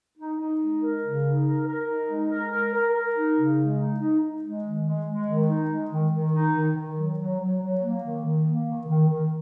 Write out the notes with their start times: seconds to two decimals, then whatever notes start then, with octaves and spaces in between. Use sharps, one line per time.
0.18 D#4
0.40 D#4
0.61 G#3
0.83 A#4
1.04 C#3
1.24 D#4
1.45 A#4
1.67 A#4
1.88 D#4
2.09 G#3
2.31 A#4
2.52 A#4
2.74 A#4
2.95 A#4
3.16 D#4
3.37 C#3
3.58 G#3
3.79 D#4
4.00 D#4
4.21 D#4
4.43 G#3
4.65 D#3
4.85 G#3
5.06 G#3
5.27 D#3
5.48 D#4
5.70 G#3
5.91 D#3
6.12 D#3
6.34 D#4
6.54 D#3
6.76 D#3
6.97 F#3
7.19 F#3
7.40 F#3
7.61 F#3
7.82 A#3
8.03 D#3
8.24 D#3
8.46 A#3
8.67 D#3
8.88 D#3
9.09 D#3